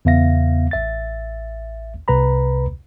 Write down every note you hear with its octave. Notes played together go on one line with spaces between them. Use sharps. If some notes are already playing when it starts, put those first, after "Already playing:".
E2 C#3 B3 E5 F5 A#6
A1 E5 A6
C2 C3 B4 A#5 B5